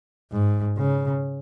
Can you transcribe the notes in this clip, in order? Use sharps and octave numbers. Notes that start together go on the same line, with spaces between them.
G#2
C#3